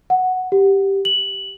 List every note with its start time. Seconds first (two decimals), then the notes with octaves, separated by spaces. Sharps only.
0.10 F#5
0.52 G4
1.05 F#7